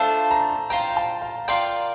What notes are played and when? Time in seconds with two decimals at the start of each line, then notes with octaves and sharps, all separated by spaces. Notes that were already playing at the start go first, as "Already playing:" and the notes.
Already playing: A3 D4 F4 C5 A5
0.31 A#5
0.70 F4 C5 G5 A#5
0.97 A5
1.22 F5
1.48 F4 A#4 D5 G5 C6